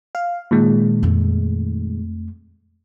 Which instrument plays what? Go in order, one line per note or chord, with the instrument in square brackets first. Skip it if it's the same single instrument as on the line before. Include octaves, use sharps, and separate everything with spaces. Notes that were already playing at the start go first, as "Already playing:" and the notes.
[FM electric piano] F5
A#2 D#3 G#3
[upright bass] F2 A3